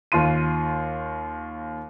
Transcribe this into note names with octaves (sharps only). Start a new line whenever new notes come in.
D#2 F4 C6 D#7